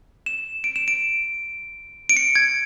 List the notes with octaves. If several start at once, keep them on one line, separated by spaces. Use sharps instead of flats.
E7
D7
E7
D7
D7
C#7
G#6